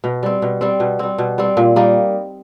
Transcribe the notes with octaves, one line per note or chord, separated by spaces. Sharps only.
B2
G3 C4
B2
G3 C4
B2
G3 C4
B2
G3 C4
A#2
G3 A#3 D#4